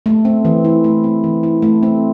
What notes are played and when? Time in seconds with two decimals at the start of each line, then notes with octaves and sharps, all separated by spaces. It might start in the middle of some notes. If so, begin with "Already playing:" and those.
0.06 A3
0.25 C4
0.45 E3
0.65 E4
0.84 A3
1.04 C4
1.24 E3
1.43 E4
1.62 A3
1.83 C4